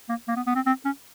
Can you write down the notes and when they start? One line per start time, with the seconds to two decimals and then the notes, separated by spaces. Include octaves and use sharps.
0.09 A#3
0.28 A#3
0.36 B3
0.47 B3
0.55 C4
0.66 C4
0.85 C#4